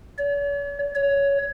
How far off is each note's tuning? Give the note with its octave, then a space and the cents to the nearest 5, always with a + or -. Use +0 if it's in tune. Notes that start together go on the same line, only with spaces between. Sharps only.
C#5 +45
C#5 +15